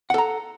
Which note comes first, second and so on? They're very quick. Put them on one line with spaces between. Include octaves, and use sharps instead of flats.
F#5 A4 A#5